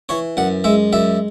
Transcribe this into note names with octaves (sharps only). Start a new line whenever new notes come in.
E3 C#5
F#2 F#5
G#3 E5
F#2 E5